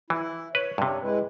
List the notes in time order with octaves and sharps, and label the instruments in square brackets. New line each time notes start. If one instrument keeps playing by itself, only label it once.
[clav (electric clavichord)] E3 [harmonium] E4
[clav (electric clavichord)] B4 [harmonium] C#5
[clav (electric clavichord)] G2 C3
[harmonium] G#3 E4 B4